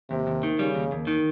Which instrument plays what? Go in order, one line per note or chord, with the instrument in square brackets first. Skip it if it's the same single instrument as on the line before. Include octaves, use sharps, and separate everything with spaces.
[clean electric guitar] D#2 [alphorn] C3
[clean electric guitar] D#2
D#3
[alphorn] C#3 [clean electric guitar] G3
[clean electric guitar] D#2
D#2
D#3